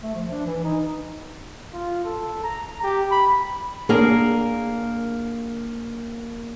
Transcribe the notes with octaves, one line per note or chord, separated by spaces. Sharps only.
A3
F3
D4
E3
D#4
F4
A4
A#5
G4
B5
A#3 D4 G#4 A#4